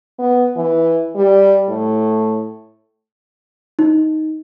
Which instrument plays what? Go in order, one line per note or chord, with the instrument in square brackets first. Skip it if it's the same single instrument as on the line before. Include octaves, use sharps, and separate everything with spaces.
[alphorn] B3
E3
G3
A2
[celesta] D#4